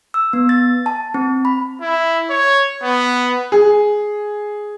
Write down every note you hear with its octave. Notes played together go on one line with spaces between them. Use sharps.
E6
B3
A6
A5
C4
B5
E4
C#5
B3
G#4